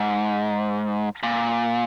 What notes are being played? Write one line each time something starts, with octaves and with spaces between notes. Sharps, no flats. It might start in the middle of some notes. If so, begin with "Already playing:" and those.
Already playing: G#2
A#2